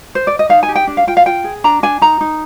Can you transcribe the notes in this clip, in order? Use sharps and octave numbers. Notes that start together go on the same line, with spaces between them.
C5
D5
D#5
D#4 F5
G#5
G4
G5
D4
F5
F4 G5
F5
F4 G5
G#4
D4 A#5
D4 G#5
D#4 A#5
D#4